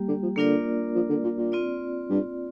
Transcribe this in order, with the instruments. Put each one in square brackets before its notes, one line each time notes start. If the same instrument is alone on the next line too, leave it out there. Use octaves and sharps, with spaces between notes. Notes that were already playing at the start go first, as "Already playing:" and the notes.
Already playing: [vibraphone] G3 A#3 G4
[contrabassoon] D3
F3
[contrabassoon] D3 [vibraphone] A#3 D4 F4 A#4 D5
[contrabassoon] F3
D3
A#2
A#2
[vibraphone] C4 F4 D5
[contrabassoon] G2